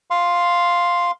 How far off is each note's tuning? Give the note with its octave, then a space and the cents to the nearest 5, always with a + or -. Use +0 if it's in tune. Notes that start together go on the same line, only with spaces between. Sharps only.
F5 +0 C6 +0